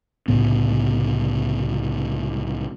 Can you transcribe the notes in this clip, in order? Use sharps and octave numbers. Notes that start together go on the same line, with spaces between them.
C2 A2 C#3 B3